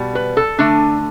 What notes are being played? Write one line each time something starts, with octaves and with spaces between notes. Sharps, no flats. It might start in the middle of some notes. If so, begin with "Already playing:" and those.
Already playing: B2 G3
B4
A4
D3 A3 D4